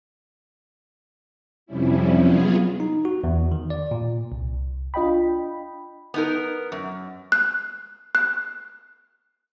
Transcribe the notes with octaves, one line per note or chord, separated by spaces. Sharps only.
F2 C3 F3 G3 C#4 E4
F#3 B3 F4 G#4
D#4
F#4
E2
D#3
D5
A#2
C2
D4 F4 D#5 G5 B5
B3 D#4 A#4
F#2
F#6
F#6